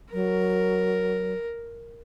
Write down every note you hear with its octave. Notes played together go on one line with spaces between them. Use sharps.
F#3 A#4